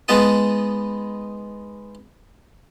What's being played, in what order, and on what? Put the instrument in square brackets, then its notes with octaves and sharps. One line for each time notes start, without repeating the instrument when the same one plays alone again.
[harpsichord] G#3 B3 D#4 B4 A5 D#6